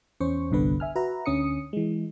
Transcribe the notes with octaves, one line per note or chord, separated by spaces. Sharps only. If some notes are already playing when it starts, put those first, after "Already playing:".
E2 C#4 C5 C#6
G1 C2 G2 D3 B3 B4
E5 G#5 F6
F#4 B4 E5 A#5
D2 D3 C#4 D#6 C#7
E3 G#3